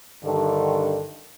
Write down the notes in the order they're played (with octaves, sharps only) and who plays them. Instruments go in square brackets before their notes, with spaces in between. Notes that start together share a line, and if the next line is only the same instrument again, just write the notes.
[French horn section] G2 D3 D#3